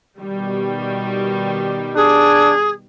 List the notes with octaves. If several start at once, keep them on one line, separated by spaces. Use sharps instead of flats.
B2 D#3 G3
D4 G#4